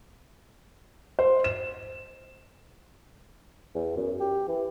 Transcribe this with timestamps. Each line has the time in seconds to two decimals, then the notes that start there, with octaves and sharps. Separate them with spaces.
1.19 C5
1.44 E7
3.75 E2
3.96 F#2
4.20 G4
4.48 E3